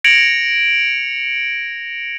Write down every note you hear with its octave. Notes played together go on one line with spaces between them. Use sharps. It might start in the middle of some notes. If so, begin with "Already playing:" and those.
G#6 A#6 C#7 D7 F7 F#7